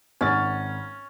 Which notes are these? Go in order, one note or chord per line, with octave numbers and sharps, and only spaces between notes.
G#1 C#4 F#5 A6